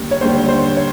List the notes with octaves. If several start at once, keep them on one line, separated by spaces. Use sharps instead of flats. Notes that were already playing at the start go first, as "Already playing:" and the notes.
Already playing: D#2 D3 G3
C#5
D#2 D3 G3 C5
C5
C#5